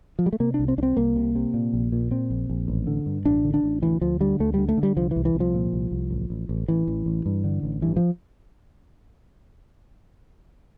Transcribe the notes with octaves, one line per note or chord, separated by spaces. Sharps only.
F3
G3
A3
C3 A#3
D4
C2
C4
C2 C4 D4
C2 A#3
C3
C3
A#2
A#1
A#2
A#2 C4
A#1
A#1
A1
D3
G2
A1 D4
D3
D4
A1
D2 E3
D2 F3
D3 G3
D2 A3
D3 G3
A3
D3
G3
C2 F3
C2 E3
E3
C2
F3
A#2
C2
C2
A1
A1
A1
A1 E3
A1
A1
G2
D3
A1
G2 E3
F3